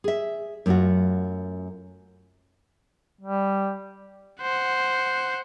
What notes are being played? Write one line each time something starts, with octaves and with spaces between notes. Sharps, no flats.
G#4 E5
F#2 A3 D4 F4 F#4
G3
C5 F#5